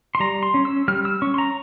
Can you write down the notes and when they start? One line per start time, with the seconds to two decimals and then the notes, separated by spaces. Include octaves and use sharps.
0.15 C6
0.20 G3 A#5
0.43 C6
0.54 C#4
0.65 E6
0.88 G3 F6
1.05 E6
1.22 C#4 C#6
1.34 C6
1.38 A#5